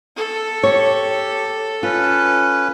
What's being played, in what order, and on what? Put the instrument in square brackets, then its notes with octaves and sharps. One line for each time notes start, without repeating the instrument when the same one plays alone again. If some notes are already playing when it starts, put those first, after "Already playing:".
[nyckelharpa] A4
[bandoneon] G4 [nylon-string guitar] C#5
[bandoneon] C#4 B4 [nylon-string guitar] F4